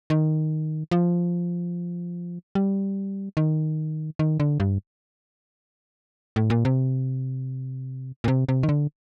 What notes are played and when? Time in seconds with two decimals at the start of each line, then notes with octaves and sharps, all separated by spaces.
0.10 D#3
0.91 F3
2.55 G3
3.37 D#3
4.19 D#3
4.40 D3
4.60 G2
6.36 A2
6.50 A#2
6.65 C3
8.24 A#2
8.28 C3
8.49 C3
8.63 D#3
8.69 D3